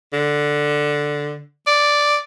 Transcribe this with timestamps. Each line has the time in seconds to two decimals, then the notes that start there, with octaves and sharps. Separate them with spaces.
0.13 D3
1.67 D5